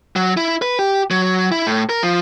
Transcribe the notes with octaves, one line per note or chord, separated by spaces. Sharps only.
F#3
E4
B4
G4
F#3
E4
A2
A#4
F3